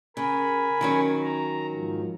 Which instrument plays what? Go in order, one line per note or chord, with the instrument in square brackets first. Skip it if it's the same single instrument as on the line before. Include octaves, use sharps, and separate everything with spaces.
[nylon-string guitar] C#3 [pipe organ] A#4 G#5 B5
[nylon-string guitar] D#3 F#3 C#4
[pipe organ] A#5
G#2 F3